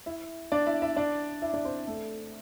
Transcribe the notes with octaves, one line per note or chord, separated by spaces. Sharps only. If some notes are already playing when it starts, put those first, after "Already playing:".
E4 E5
D4 D5
E4 E5
E4 E5
D4 D5
E4 E5
D4 D5
C4 C5
A3 A4